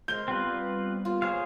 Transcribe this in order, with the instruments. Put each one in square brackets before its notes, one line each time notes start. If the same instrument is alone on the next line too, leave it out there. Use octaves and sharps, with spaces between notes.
[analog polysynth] G#3 C5 [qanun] A#4 C6 [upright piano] G6 G7
[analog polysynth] G3 B3 [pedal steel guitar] C4 F4 B4
[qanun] A#3 F4
[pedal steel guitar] G#4 C#5 F5 [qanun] C5